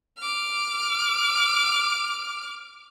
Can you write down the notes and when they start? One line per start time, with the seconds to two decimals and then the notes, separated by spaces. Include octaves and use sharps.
0.18 D6 F6